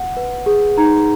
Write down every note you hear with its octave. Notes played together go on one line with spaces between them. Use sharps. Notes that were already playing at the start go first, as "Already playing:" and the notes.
Already playing: F#5
B4
G#4
D#4 A#5